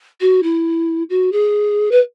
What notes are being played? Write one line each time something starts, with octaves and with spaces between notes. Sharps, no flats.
F#4
E4
F#4
G#4
B4